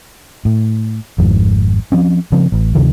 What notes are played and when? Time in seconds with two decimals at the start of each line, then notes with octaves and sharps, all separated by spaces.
0.45 A2
1.18 G#1 F2 G#2
1.92 F3 C4 C#4
2.32 C#3 F3 C4
2.52 A1
2.75 D2 C3 D#3 F3